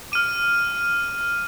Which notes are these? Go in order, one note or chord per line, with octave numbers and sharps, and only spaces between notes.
D6 F6 D#7